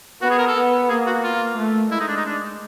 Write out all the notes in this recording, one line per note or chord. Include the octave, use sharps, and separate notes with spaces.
B3 F#4
G#4
A#4
A4
B3
A#3 G#4
F#4
F4
A3
G#3 E4
D#4
D4
D#4
D4